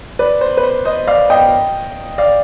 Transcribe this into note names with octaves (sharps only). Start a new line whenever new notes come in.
B4 D5
C5
B4
C5
C5 D#5
D5 F5
D#5 G5
D5 F5